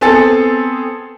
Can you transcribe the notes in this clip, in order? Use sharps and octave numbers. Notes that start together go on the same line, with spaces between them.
B3 C4 G#4 A4 A6